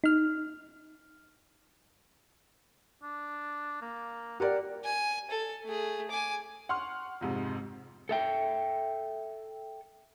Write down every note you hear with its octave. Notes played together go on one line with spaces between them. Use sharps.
D#4 F6
D4
A#3
G4 A#4 D5 F#5
G#5
A4
A3 G#4
G#5 D6
F#5 C6 C#6 F6
F2 G#2 C3
A4 E5 G5